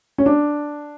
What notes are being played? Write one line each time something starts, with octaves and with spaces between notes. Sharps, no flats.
C#4
D4